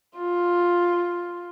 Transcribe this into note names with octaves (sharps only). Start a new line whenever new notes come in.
F4